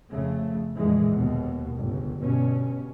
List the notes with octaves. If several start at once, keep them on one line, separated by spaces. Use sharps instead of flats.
F2 C#3 A3
F2 A#2 D3 E3 G#3
D#2 B2
G1 C#2
G2 B2 C#4